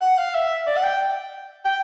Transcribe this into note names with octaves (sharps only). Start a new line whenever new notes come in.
F#5
F5
E5
D5
F#5
G5
G5